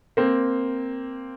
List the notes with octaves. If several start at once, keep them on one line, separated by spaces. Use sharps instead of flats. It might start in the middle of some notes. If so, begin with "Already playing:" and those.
A#3 C4